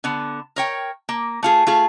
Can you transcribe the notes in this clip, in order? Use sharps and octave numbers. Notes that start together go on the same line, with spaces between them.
D3 B3
A#4 C#5 G5
A#3
A3 F4 G#4
A3 F4 G#4